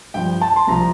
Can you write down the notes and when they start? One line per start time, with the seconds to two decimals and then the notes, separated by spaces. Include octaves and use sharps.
0.14 G2 F3 G5
0.41 A5
0.56 C6
0.67 C2 C3 F3 A#5